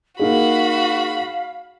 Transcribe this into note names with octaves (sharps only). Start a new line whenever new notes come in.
A#3 D#4 F#4 G#4 F5 B5